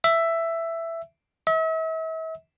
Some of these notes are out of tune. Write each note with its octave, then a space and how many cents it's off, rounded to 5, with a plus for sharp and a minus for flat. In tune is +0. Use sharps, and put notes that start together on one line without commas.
E5 +10
E5 -40